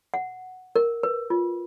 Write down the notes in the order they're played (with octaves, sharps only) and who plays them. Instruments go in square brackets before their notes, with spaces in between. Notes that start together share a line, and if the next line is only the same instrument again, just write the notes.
[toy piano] F#5
A#4
B4
F4